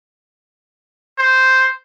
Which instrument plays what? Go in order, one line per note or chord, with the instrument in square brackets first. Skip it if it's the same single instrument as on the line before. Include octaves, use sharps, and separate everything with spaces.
[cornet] C5